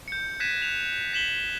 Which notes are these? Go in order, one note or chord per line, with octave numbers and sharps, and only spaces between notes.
G6 C#7
F#6 G#6 A#6 B6 D#7 E7
F#6 E7 F7
B6 E7 F#7 G7